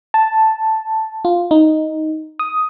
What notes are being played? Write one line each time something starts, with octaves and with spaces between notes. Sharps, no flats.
A5
F4
D#4
D#6